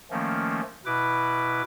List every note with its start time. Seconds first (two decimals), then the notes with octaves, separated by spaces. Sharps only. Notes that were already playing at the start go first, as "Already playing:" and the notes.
0.11 D#3 F3 A3 A#3 C#4
0.86 B2 E4 B4 D6